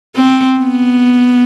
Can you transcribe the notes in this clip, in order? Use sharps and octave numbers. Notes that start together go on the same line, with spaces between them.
C4
B3